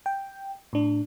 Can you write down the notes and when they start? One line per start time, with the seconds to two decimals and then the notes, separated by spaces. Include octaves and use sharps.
0.06 G5
0.73 A2 D4